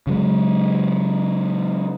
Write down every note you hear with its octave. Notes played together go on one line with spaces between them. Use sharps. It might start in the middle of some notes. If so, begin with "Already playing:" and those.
C#3 F#3 G#3